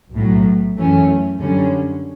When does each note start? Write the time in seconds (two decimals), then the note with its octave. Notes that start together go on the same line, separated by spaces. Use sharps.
0.12 B1 A2 F#3
0.76 F#2 E3 A3 C#4
1.39 F#2 D3 G3 C#4